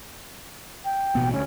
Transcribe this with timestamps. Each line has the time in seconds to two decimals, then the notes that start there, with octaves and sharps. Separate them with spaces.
0.85 G5
1.15 A1 B2 B3
1.33 D2 C#4